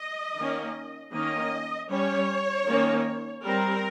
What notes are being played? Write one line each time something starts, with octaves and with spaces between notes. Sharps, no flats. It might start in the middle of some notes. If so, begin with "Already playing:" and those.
Already playing: D#5
D#3 A#3 C#4
D#3 A#3 C#4 D#5
G3 C#4 C#5
D#3 A#3 C#4
G3 C4 A#4